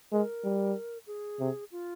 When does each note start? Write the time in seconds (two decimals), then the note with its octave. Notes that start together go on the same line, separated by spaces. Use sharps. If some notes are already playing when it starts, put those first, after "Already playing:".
0.12 G#3 A#4
0.44 G3
1.07 G#4
1.40 C3
1.72 F4